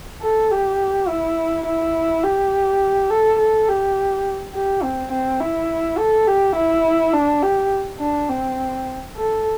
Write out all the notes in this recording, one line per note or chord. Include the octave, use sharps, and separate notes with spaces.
A4
G4
E4
E4
G4
A4
A4
G4
G4
C4
C4
E4
A4
G4
E4
D4
G4
D4
C4
A4